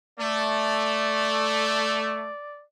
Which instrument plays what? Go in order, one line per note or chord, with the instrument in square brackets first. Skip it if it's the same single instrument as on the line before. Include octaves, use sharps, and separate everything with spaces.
[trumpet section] A3 [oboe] D5